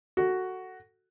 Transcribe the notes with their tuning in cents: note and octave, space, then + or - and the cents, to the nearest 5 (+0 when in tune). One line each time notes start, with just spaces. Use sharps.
F#4 +5 A4 +15